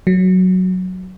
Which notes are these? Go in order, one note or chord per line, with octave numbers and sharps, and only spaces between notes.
F#3